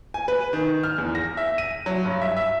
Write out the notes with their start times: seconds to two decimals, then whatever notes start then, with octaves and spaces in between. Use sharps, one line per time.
0.14 G#5
0.28 B4
0.53 D#3
0.83 F6
0.98 E2
1.15 A#6
1.37 E5
1.58 D#7
1.86 F#3
2.05 G2
2.21 E5
2.37 E5